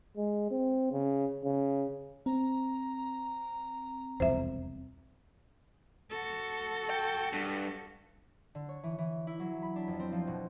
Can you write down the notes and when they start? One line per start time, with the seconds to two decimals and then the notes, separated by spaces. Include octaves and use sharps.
0.17 G#3
0.51 C4
0.91 C#3
1.44 C#3
2.26 C4 A#5
4.20 E1 C2 F2 C5 E5
6.10 F#4 A4
6.90 G5
7.33 G2
8.55 D3
8.69 C#5
8.83 E3
8.98 E3
9.27 E4
9.40 F#3
9.62 B5
9.76 D4
9.88 F2
9.99 C4
10.12 F3
10.27 B2